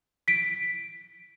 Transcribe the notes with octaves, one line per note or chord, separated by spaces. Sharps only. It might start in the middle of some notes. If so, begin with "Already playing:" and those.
B6 D7